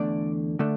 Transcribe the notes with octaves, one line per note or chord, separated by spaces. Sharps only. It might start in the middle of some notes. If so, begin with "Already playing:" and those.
Already playing: E2 D3 A3 D4 D5
D3 A3 D4